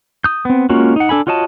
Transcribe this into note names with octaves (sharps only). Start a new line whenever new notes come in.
D#6 G6
B3 C4
G#3 A#3 C#4 F4 F#4
D#4 F#5
D4 A4 G#5 B5
F4 F#4 C#5 D#5 A5